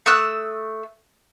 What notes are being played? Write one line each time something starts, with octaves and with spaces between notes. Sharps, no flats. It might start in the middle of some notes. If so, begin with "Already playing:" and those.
A3 D#6 E6 F#6